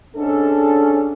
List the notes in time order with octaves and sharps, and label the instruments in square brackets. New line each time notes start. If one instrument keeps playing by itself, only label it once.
[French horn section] G#2 A4 [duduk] C#4 [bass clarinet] D4